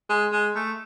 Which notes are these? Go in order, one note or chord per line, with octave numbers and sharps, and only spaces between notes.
G#3
G#3
A3